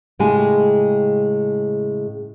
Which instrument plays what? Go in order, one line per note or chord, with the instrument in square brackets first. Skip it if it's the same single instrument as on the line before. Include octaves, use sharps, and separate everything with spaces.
[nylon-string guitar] A2 C#3 G#3 G4 G#5